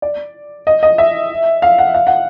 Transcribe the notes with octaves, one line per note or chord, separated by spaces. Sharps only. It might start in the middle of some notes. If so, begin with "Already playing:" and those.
D5
D#5
D#5
E5
F5
F#5
F5
F#5